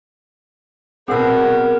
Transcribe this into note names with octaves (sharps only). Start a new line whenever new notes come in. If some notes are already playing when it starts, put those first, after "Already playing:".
B2 B3 C4 F#4 G#4 A#4 F#5 E6